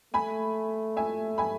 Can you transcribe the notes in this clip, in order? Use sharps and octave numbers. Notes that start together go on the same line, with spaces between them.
A3 G#5 B5
E5 G#5
G#5 B5